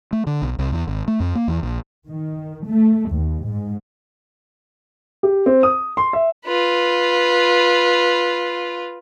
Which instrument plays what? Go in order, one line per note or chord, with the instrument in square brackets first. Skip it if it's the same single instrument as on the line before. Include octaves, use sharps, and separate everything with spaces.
[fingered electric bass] A3
D3
B1
C2
E2
G#1
A3
F2
A#3
E2
A#1
[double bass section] D#3
A3
D#2
G#2
[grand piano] G4
C4
D#6
C6
E5
[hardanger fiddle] F4 B4